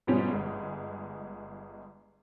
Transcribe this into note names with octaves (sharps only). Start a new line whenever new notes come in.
G#2 B2 F3 G3 B3 C#4
G1 G#3